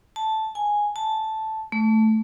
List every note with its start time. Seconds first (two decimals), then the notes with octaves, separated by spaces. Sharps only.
0.16 A5
0.55 G#5
0.96 A5
1.72 A3